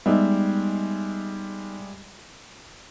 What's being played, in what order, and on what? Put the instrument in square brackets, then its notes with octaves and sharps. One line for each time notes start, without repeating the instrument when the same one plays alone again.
[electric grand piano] G3 G#3 E5 [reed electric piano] B3 D#4